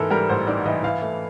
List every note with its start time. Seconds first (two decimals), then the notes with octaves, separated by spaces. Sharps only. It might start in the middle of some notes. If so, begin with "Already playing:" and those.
Already playing: G#2 E3 A4 A#4
0.10 G3 A#4
0.29 A1 C5
0.47 G#2 D5
0.65 E3 D#5
0.83 E3 F5
1.02 A3